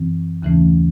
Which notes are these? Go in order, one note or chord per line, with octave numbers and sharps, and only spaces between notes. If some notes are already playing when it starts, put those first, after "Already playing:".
Already playing: F#2 E3 C4
D#2 C#3 E3 A3 C#4